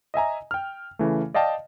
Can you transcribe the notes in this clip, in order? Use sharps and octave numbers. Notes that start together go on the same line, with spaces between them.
D#5 E5 G#5 A#5
G5 F6
C#3 E3 A3
D5 D#5 F5 G5 A5